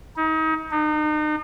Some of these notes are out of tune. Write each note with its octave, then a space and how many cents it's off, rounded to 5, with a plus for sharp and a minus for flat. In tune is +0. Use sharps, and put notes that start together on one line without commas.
D#4 +35
D#4 -35